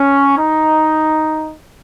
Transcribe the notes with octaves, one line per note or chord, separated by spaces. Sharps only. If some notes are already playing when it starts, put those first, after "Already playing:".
Already playing: C#4
D#4